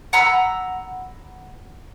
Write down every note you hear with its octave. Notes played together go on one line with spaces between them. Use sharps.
F#5 A#5 B5 E6